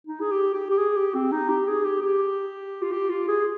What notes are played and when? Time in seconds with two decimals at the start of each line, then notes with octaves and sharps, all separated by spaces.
0.07 D#4
0.21 G#4
0.31 G4
0.54 G4
0.70 G4
0.78 G#4
0.96 G4
1.15 C4
1.32 D#4
1.49 G4
1.68 G#4
1.85 G4
2.02 G4
2.82 F4
2.91 G4
3.10 F4
3.28 G#4